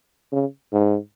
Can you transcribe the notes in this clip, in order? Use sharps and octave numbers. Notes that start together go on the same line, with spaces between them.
C#3
G#2